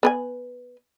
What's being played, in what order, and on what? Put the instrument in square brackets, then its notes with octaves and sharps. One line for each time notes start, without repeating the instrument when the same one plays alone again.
[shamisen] B3 B4 G#5